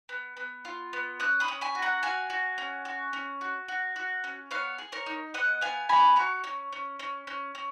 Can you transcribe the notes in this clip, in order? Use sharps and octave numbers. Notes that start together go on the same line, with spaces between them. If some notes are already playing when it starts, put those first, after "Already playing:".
B3
B3
F4
B3
C#4 D#6 F#6
B5 D#6
C#4
G#5 B5
F#4
F#5 A#5
F#4 F5 G#5
F#4
C#4
F#4
C#4
F#4
F#4
F#4
C#4
B3 C#5 F5
G#4
A#4 C#5
D#4
B3 D#5 F#5
B3 F5 G#5
B3 G#5 B5
F#4 A#5 C#6
C#4
C#4
C#4
C#4
C#4